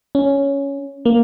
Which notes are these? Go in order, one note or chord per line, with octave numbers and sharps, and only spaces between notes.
C#4
A#3